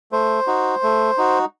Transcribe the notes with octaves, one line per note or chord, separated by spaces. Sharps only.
A3 C5
D#4 F#4
A3
D#4 F#4